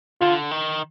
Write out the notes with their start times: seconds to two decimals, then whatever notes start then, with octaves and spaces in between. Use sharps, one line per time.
0.21 D3 F4
0.51 D#3